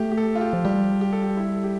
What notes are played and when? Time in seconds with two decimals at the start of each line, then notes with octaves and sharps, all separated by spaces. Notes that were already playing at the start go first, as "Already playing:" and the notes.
Already playing: A3 G4
0.12 G4
0.17 A4
0.35 F4
0.41 G4
0.53 F3
0.65 G3 G4
1.01 G4
1.13 A4
1.23 G4
1.37 E4
1.55 A4
1.64 G4